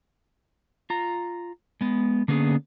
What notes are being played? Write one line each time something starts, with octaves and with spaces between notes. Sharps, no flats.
F4 A#5
G#3 B3
D3 A#3 B3 C#4 G#4